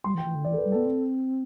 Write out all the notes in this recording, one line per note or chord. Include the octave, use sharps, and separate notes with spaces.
G3 C6
E3
G5
E3
D3
E3 D5
A4
B4
G3
B3 A4
C4